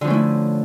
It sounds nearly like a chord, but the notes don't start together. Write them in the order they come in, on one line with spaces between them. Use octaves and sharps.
D3 F3 C#4 A3 E4